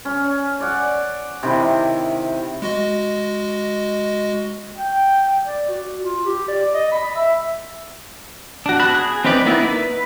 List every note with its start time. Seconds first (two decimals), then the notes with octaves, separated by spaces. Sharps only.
0.05 C#4
0.60 D5 F#5
1.43 C3 D#3 E4
2.62 G#3 F#4 D#5
4.77 G5
5.46 D5
5.69 F#4
6.02 F4
6.25 G4
6.48 D5
6.74 D#5
6.91 B5
7.16 E5
8.66 D4 F#4
8.79 B3 F#4 A5 B5 F#6
8.95 G#4
9.25 C4 C#4 D#4 B4 D5
9.46 A#3 B3 D#4 E4 D5
9.62 B4